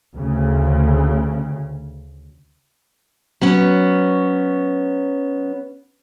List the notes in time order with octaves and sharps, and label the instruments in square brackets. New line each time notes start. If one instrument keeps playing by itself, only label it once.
[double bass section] D2 C#3
[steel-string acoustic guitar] F#3 B3 C#4